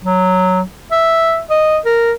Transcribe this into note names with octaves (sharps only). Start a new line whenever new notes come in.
F#3
E5
D#5
A#4